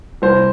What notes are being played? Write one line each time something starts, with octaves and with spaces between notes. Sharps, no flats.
C2 C5